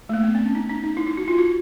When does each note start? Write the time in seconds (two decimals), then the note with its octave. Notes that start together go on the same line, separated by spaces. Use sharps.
0.09 A3
0.13 A#3
0.23 B3
0.35 C4
0.45 C#4
0.55 D#4
0.69 D#4
0.83 D#4
0.97 E4
1.07 E4
1.17 F#4
1.28 F4
1.38 F#4